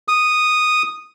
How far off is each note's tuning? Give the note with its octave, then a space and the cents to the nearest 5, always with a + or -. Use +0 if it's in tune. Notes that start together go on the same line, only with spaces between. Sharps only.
D#6 -5